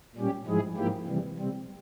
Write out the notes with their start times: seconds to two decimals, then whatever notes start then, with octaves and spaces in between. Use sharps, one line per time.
0.16 A#2 G3 C#4 G4
0.46 G#2 F3 G#3 E4 G#4
0.76 G#2 F3 A#3 E4 G4
1.07 C3 E3 G3
1.37 C3 G3 C4